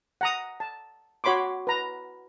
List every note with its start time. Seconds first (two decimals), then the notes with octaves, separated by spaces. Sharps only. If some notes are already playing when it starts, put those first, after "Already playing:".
0.21 F#5 A#5 D#6
0.60 A5
1.24 F#4 C#5 B5 C6 D6
1.67 B4 A#5